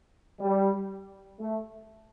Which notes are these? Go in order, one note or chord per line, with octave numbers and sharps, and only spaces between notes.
G3
A3